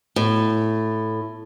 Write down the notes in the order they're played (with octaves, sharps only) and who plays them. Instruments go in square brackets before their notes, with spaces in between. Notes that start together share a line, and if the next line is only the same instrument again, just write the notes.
[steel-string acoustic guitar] A2